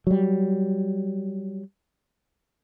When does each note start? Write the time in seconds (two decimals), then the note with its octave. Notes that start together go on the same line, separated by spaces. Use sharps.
0.07 F#3 G3